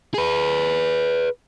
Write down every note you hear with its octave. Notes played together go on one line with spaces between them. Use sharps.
G#4 B4